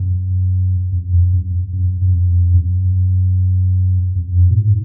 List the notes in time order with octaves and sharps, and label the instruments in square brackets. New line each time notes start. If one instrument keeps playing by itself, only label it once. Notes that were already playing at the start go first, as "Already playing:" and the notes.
Already playing: [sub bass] F#2
F2
F2
F#2
F#2
F#2
F2
F#2
F2
F#2
A#2
G#2